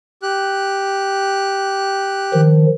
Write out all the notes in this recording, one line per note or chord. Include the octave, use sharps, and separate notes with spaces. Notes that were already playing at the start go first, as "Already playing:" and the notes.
G4 F#6
D#3 F3